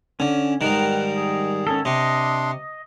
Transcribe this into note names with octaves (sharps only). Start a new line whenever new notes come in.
D3 C#4
G#2 D#3 G3 A#4 B4
G#4
C#4 A4
C3 D4 D#5 C6